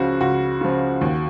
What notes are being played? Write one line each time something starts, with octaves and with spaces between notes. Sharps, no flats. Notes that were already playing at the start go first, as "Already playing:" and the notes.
Already playing: C#2 C#3 F3 F#4
C#2 F#4
C#3 F3
D#2